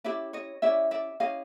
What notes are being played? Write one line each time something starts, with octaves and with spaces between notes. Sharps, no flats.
C#4 E4 G4 D5 E5
C#5 D#5
C#4 E4 G4 D5 E5
D5 E5
C#4 E4 G4 D#5 F5